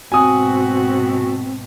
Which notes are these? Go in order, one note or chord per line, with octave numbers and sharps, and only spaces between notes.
G#2 B2 C4 F#4 G#5 D#6